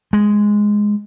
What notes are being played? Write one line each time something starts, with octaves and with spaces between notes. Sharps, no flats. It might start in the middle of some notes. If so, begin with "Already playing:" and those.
G#3